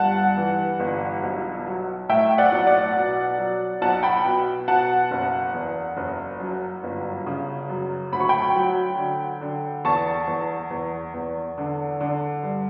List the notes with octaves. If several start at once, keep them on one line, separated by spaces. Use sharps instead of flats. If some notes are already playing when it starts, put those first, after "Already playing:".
Already playing: G1 G2 F#5 A5
E3
G1
B1
F#3
A2 E5 G5
D5 F#5
B1
D5 F#5
B2
F#3
B1 F#5 A5
G5 B5
B2
B2 F#5 A5
F#1
E2
F#1
F#2
G1
C#3
F#2
D2 B5
C#6
G5 B5
F#3
D3
D3
E2 A5 C#6
E2
E2
E2
D3
D3
G2